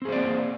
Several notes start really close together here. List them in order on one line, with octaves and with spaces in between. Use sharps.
C4 G#4 C5 D5 A#3